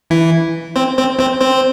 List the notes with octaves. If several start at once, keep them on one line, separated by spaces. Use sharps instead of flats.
E3 E4
C4 C5
C4 C5
C4 C5
C4 C5